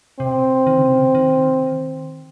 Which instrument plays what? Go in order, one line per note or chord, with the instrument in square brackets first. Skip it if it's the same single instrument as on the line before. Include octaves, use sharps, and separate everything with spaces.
[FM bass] C3 [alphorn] C4
[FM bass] D#3
C#3
C3
C#3
D#3